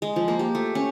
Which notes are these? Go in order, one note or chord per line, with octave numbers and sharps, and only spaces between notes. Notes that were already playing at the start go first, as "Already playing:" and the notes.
G#3
F3
A#3
G4
A3
C#4